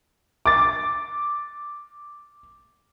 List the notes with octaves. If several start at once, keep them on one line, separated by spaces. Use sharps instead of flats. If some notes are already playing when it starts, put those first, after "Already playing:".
D6 A6